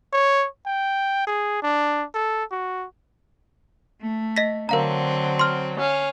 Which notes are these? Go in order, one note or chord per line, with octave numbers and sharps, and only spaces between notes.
C#5
G5
G#4
D4
A4
F#4
A3
D#5 A#6 B6
D3 F#3 C4 A#4 F5 A#5
C6 F6
C#4 F5